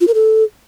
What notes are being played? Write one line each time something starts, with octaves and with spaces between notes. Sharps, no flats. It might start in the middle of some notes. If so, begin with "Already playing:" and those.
F4
A#4
A4